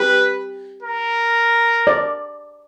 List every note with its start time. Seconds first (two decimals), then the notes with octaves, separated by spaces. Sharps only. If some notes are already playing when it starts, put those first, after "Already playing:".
Already playing: G4 B4
0.83 A#4
1.87 D5